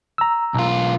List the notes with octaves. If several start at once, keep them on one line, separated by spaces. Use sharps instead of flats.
A#5 E6
B1 F4